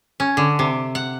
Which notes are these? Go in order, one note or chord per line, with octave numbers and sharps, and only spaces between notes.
C#4
D3
C3
F#5